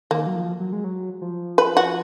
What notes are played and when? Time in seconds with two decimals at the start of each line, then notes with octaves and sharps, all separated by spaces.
0.11 D#3 A#3
0.27 F#3
0.35 F3
0.60 F#3
0.73 G#3
0.84 F#3
1.21 F3
1.58 B4
1.77 F#4